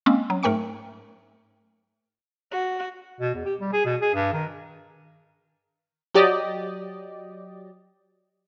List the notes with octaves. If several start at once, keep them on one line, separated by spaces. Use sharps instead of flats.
G#3 A#3 C4 C#4
F#3
G#2 A3 A#4 G5 C#6 C#7
F#4
B2
E2
G4
G3
G#4
B2
G#4
G2
D#3
F#3 G4 D5 D#5